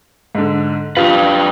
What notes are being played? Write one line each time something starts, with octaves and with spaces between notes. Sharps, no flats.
G#2 D3
F2 F4 G4 B4